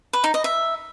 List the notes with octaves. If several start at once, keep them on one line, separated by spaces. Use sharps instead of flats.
B4
D#4
D#5
E5